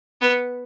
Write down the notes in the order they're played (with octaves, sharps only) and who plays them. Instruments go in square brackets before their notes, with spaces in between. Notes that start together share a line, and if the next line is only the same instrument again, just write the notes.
[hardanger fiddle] B3